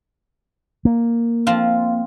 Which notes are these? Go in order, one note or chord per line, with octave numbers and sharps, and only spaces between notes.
A#3
F3 C4 F4